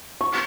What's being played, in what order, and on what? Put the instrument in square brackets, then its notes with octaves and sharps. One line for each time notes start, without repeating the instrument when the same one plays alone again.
[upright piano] C#6